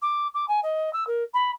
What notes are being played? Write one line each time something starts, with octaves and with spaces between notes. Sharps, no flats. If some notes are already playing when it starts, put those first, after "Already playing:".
D6
D6
G#5
D#5
E6
A#4
B5